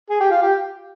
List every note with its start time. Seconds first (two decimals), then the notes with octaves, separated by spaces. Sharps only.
0.10 G#4
0.20 G4
0.31 F4
0.42 G4